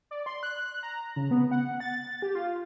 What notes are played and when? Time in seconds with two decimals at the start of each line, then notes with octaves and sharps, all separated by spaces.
0.11 D5
0.26 C6
0.43 F#6
0.83 A#5
1.16 C#3
1.31 B3
1.51 F#5
1.80 A6
2.22 G4
2.35 F4